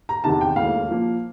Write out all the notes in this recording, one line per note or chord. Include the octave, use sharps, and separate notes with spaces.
A#5
E2 C3 D#3 A5
G5
E1 D#2 C#3 E3 A3 F5
A#2 F3 A#3